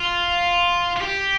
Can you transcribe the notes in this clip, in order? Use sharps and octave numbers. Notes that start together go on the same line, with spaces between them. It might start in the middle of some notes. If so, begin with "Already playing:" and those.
Already playing: F4
F4
G4